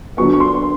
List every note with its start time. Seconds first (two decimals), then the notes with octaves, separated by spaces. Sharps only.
0.17 D3 F#3 B3 C#6
0.33 C#6
0.40 C6